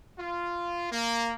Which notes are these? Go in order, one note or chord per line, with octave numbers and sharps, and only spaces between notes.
F4
A#3